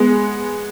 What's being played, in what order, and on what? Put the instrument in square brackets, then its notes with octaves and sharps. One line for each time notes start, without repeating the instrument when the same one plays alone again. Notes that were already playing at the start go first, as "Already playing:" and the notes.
Already playing: [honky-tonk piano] G#3 B3